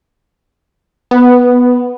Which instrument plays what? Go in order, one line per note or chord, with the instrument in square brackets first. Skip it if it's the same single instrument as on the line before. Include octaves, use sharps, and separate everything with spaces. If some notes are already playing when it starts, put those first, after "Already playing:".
[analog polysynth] B3